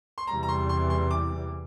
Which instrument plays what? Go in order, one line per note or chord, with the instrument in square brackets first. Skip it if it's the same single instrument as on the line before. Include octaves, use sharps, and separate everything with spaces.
[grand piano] C6
[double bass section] E2 C3 E3 G3 [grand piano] A#5
[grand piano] A#5
C6
C6
C6
D6